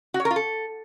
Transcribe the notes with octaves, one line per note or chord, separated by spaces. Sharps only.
F#4
C#5
A#4
F4
A4